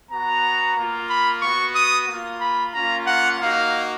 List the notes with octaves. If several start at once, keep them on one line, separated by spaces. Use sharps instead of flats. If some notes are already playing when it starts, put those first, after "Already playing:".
B3 F#4 A#5
A#3 F4
B5
B3 F#4 C#6
D#6
A#3 F4
B5
A#3 C#4 F4 A#5
F#5
A#3 D#4 F#4 F5